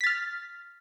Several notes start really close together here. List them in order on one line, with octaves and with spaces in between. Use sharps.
B6 A6 F6